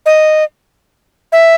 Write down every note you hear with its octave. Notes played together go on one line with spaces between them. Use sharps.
D#5
E5